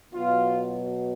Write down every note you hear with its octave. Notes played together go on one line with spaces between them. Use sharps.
B2 F#3 F4